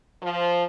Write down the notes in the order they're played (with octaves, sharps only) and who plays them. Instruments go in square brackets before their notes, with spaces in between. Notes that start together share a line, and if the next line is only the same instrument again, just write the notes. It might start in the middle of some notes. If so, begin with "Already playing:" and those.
[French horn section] F3